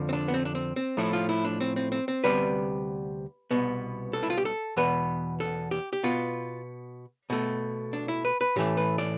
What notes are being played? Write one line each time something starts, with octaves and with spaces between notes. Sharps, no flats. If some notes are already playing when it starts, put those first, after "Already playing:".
Already playing: F2 D3 F3
C4
D4
B3
C4
D4
C4
C4
A2 F3 A3 E4
F4
E4
D4
C4
C4
C4
C4
D2 C3 G3 B3 B4
C2 B2 B3
A4
E4
F4
G4
A4
E2 B2 B3 B4
A4
G4
G4
B2 B3 F4
B2 A3
D4
E4
B4
B4
A2 E3 A3 G4
B4
D5